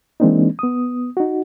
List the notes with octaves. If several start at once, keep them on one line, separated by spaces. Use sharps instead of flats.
E3 G#3 A#3 C4 D4 D#4
B3 D#6
D#4 F#4